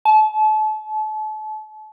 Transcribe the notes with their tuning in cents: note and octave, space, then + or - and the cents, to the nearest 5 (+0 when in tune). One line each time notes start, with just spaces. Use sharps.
A5 -35